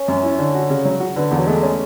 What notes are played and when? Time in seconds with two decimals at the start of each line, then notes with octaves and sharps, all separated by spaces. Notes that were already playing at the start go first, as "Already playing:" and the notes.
Already playing: C#4
0.08 F#2
0.23 E4
0.39 D3
0.54 F#4
0.70 C#3
0.85 F#3
1.00 F#4
1.16 D3 B3
1.31 E2
1.38 F#3
1.47 G#3 A3
1.63 C#4